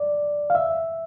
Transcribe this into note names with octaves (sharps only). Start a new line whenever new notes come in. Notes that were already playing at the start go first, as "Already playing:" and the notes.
Already playing: D5
F5
E5